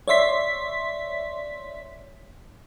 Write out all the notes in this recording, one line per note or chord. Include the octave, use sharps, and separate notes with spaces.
C#5 D5 E5 C6 B6